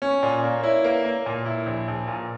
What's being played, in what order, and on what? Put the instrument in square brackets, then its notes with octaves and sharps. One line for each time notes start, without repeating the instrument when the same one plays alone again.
[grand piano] C#4 [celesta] C#5
[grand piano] A#2 [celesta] D5
[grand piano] A#3 [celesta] D5
[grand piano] E4 [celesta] C#5
[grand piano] A#3 [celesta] B4
[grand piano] A#3
A#2
E4
A#1
A#1
A#2